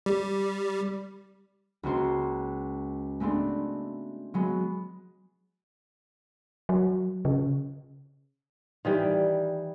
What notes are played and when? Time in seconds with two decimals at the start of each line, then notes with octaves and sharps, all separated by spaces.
0.06 G3
1.83 C#2 A#3 F#4 C5 C7
3.20 G#3 A3 B3 C4 D4
4.34 F#3 G#3 B3
6.69 F#3
7.25 C#3
8.85 D#3 E3 G3